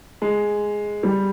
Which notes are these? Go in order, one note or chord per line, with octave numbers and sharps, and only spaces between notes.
G#3
G3